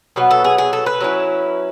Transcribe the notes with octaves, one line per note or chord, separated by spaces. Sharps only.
B2 F#3 B3 B4
A4
G#4
G#4
A4
B4
F#3 C#4 E4